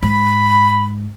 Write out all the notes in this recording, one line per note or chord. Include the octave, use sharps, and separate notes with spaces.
G#2 B5